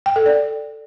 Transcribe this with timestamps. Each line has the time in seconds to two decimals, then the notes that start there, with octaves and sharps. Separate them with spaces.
0.06 G5
0.16 A4
0.26 D5